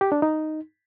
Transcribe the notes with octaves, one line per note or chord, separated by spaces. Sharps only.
G4
D4
D#4